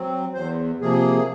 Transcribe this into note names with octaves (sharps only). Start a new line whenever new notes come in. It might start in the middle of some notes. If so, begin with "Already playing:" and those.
Already playing: F#3 C4
E2 C5
C3 F3 A#3 G#4